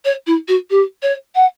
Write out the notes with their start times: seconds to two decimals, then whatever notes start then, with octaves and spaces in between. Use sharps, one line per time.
0.05 C#5
0.27 E4
0.48 F#4
0.70 G4
1.02 C#5
1.35 F#5